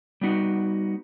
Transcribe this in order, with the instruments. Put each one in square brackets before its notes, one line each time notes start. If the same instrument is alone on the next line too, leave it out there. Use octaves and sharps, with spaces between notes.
[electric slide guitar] G3 B3 D#4 F#4